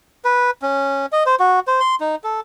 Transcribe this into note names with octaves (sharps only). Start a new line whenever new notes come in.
B4
C#4
D#5
C5
F#4
C5
C6
D#4
A4